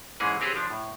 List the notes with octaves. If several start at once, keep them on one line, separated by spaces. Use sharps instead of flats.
G#2 E3 G#3 A#3 C#4 G#4
C4 G4 G#4 A#4 B4 C#5
F3 D4
A2